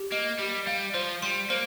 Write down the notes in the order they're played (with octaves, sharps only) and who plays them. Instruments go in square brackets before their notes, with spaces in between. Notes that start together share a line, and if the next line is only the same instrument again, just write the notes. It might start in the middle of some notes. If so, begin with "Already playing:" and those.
Already playing: [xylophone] G4
[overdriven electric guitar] A#3 [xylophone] D#5
[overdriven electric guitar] G3 [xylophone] G4
[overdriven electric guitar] G3 [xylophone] F5
[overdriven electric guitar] F3 [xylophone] C5
[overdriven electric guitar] G3 [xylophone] C6
[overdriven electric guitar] A#3 [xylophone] C5